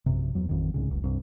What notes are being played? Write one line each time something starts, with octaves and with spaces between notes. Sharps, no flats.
A#1 F#2 C3
E2 F#3
A1 F2 D#3
C2 G#2 C#3
F#1 C#2
C2 G2